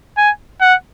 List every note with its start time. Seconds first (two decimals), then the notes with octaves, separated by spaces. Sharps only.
0.17 G#5
0.61 F#5